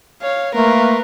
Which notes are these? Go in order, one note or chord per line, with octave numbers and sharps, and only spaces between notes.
C#5 F5
A3 A#3 A#4 B4 C6